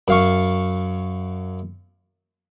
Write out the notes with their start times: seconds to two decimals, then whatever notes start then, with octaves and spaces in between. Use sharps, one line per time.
0.08 F#2 F5 C#6